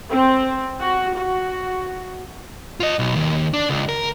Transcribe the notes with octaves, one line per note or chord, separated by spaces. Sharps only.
C4
F#4
F#4
F4 D#5
B1
D#2
D4
C#2
A#4